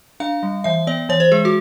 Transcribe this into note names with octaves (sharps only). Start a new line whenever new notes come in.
D4 F5
G3
E3 E5
B3 D5
E3 C#5
C5
G#3 G#4
F#4